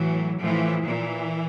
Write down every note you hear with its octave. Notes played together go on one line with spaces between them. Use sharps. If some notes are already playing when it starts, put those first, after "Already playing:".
Already playing: A2 E3 F#3
A2 E3 F3
A#2 E3